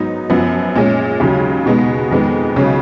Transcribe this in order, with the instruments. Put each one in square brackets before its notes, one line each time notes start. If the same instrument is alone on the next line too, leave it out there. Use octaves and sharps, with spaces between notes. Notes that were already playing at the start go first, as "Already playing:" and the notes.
Already playing: [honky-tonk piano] G#2 F#3 B3 D#4
F#2 F3 B3
A#2 G#3 C#4
D#2 C#3 F#3
B2 G#3 B3 D#4
F2 D#3 G#3 B3
C#2 C#3 F#3 C#4